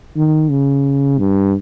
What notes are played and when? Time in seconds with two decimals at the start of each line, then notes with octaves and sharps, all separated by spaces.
0.17 D#3
0.50 C#3
1.18 G2